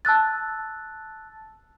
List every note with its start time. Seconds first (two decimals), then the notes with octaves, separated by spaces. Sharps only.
0.05 A5 E6 F#6 A6